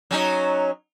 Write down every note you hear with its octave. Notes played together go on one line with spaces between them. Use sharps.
F#3 C#4 D#4